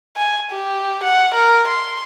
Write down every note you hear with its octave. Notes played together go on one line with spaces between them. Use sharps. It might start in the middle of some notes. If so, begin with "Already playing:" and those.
G#5
G4
F#5
A#4
C6